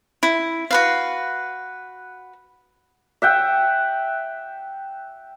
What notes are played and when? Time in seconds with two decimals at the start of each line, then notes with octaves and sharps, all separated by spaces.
0.23 E4
0.71 F#4 B4 F5
3.22 E5 F#5 G5